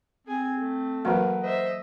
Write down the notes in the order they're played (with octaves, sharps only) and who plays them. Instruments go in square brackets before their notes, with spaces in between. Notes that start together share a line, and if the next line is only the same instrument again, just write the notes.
[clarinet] C4 [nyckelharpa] G#4 G#5
[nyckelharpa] A3
[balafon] E3 F#3 A#3 [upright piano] F#4 A#4 B4
[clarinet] C5 [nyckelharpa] D#5 E5